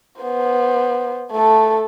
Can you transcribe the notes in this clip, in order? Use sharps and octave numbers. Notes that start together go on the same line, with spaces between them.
B3 C5
A3 A4